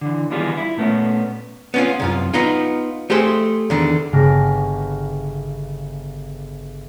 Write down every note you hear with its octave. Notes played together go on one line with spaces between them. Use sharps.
D3 E3
D#3 E3 G3 B3 F4 G#4
E4
A#2 A3 B3 C#4
B3 C#4 F4
C2 F#2 F4
B3 D#4 F4
A3 G4 G#4 C5
E2 D3 D#3
G1 C#3 B3 D6 F6 A#6